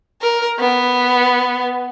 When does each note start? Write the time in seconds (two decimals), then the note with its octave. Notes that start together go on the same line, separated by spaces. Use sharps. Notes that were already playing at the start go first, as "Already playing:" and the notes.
0.22 A#4
0.60 B3